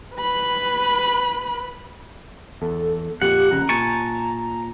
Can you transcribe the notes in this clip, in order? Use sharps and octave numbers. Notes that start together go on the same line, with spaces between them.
B4 B5
E2 A4
F2 A#2 G4 F#5
F1 F2 C#3 A#5
A#2 G#5 A5 C#6